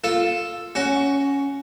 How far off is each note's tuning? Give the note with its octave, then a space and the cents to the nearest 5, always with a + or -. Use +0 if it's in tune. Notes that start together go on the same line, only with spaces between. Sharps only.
F4 +0 A4 +0
C#4 +5 F#4 +15